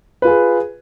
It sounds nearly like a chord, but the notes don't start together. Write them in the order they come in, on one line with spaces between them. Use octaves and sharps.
B4 F4 G#4